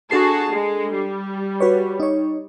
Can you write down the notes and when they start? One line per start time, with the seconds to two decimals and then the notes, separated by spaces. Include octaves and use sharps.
0.11 D4 F#4 G#4 A4 A5 C7
0.52 G#3
0.93 G3
1.60 F#4 B4 C#5
2.00 D#4 C#5